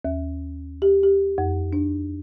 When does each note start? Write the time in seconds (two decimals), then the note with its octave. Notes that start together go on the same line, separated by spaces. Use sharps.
0.05 D#2
0.82 G4
1.03 G4
1.38 F2
1.73 D4